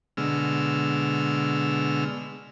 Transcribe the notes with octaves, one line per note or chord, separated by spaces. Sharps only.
B2 D3 G#3 E6 F6